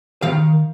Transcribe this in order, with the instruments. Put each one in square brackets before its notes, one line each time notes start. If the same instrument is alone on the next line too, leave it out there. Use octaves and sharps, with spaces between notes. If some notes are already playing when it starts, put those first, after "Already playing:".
[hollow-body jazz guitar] D#3 F5